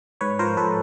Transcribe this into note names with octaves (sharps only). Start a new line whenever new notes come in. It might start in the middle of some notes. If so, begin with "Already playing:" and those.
G#2 B4 C#5
F3 A#4 C5
G#2 A4 B4